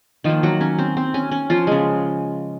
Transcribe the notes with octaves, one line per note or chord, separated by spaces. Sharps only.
D#3 F3 A#3 F4
F#3 F#4
C#4
C4
C4
C#4
C#4
F3 F4
C#3 G#3